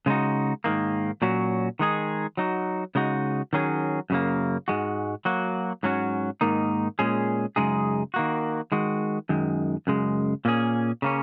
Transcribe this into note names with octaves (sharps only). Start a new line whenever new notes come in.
C#3 G#3 D#4 F#4
G#2 D#3 A#3
A#2 F#3 C#4 F#4
D#3 G#3 D#4 G#4
F#3 D#4 F#4
C#3 G#3 D#4 F#4
D#3 F#3 C#4 G#4
F#2 C#3 A#3
G#2 G#3 F#4
F#3 A#3 F#4
G#2 F#3 C#4 F#4
G#2 D#3 A#3 D#4
A#2 G#3 C#4 G#4
F#2 C#3 G#3 D#4 G#4
D#3 A#3 F#4
D#3 G#3 F#4
F#2 D#3 G#3
F#2 C#3 G#3
A#2 A#3 C#4 G#4
C#3 A#3 C#4